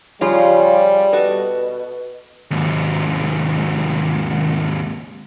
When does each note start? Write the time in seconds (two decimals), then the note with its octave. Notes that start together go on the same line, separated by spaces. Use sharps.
0.21 C#3 F3 G3 C#4 F4
1.12 B2 F#4 A4 D#5
2.51 D#2 G#2